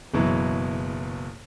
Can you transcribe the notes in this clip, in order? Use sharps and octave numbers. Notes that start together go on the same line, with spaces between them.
F#1 B2 E3 F#3